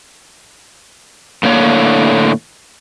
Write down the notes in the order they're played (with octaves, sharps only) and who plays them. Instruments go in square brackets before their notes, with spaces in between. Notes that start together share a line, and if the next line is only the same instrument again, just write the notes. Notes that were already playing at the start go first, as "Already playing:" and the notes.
[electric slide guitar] A2 D3 A#3 C#5